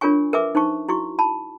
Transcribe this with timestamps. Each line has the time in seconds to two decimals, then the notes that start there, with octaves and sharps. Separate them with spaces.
0.01 D4 F4 A#4 C#5 G#5 C#6
0.33 A#4 B4 E5 G#5 D6
0.55 D#4 C5 A5 C#6
0.89 E4 F#4 C#6
1.19 A5 B5